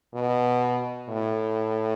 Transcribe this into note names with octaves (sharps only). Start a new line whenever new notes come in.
B2
A2